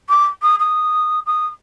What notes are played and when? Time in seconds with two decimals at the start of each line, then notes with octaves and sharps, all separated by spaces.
0.09 D6
0.42 D#6
0.60 D#6
1.26 D#6